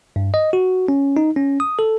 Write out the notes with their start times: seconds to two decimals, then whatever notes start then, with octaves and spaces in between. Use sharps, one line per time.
0.16 G2
0.34 D#5
0.53 F#4
0.88 C#4
1.17 D#4
1.36 C#4
1.60 D#6
1.79 A4